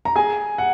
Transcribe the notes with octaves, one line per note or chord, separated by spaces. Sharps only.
A#5
G#4 G#5
F#5